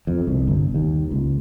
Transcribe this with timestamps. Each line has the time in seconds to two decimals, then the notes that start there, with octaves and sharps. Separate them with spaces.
0.07 F2
0.27 C2
0.47 G1
0.74 D#2
1.11 C#2